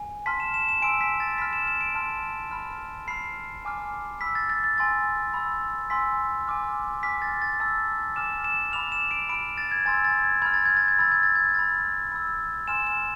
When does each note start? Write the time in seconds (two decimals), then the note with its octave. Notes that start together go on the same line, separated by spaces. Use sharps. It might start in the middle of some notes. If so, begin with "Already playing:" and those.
Already playing: G#5
0.26 A5 C6 F6 B6
0.40 E7
0.54 E7
0.69 E7
0.82 G#5 C6 E6 D7
1.01 B6
1.20 A6
1.38 B5 F6 B6
1.53 E7
1.68 E7
1.81 D7
1.95 A5 C6 F6
2.51 B5 F6
3.08 B5 F6 C7
3.65 G#5 D6 F6
4.21 B5 E6 B6
4.35 A6
4.50 A6
4.64 A6
4.77 G#5 C6 E6 A6
5.34 B5 E6
5.90 G#5 C6 E6 B6
6.47 G#5 D6 F6
7.03 G#5 D6 F6 B6
7.22 A6
7.42 A6
7.60 A5 E6 A6
8.16 G#5 D6 F6 E7
8.44 E7
8.72 B5 D6 F6 F7
8.92 E7
9.11 D7
9.29 B5 F6 D7
9.58 A6
9.72 G#6
9.86 G#5 C6 E6 A6
10.04 A6
10.23 G#6
10.42 B5 F6 G#6
10.54 A6
10.66 G#6
10.77 A6
10.88 G#6
10.99 B5 E6 A6
11.12 G#6
11.23 A6
11.35 G#6
11.54 B5 F6 A6
12.12 B5 E6
12.68 G#5 C6 F6 E7
12.87 E7